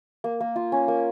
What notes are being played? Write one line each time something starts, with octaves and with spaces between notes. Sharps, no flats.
A#3
A#3
F4
C#4
A#3